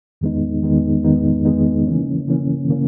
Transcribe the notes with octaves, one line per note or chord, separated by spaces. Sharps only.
E2 D#3 G#3 B3 D#4
E2 D#3 G#3 B3 D#4
E2 D#3 G#3 B3 D#4
E2 D#3 G#3 B3 D#4
C#3 E3 A#3 C#4
C#3 E3 A#3 C#4
C#3 E3 A#3 C#4